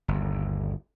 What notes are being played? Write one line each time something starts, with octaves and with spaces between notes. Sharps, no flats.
G1 D#2